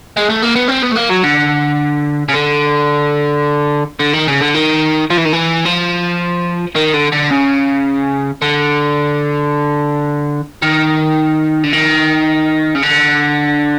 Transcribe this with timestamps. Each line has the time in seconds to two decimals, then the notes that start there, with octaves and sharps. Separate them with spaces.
0.17 G#3
0.29 A3
0.42 A#3
0.55 B3
0.68 C4
0.82 B3
0.91 A3
0.96 A#3
1.09 F#3
1.23 D3
2.28 C#3
2.34 D3
3.99 D3
4.13 D#3
4.28 C#3
4.41 D3
4.54 D#3
5.10 F3
5.17 E3
5.25 D#3
5.33 E3
5.65 F3
6.76 D#3
6.94 D3
7.12 D3
7.31 C#3
8.42 D3
10.62 D#3
11.63 D3
11.73 D#3
12.75 C#3
12.83 D3